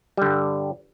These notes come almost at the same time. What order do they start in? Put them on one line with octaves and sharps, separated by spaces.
G3 D3 G2